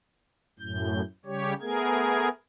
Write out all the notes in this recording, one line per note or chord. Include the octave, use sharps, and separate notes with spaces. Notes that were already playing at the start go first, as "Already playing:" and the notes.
F#2 A2 G6
C#3 G3 G4 C#5
A3 B3 G#4 A#4 G#6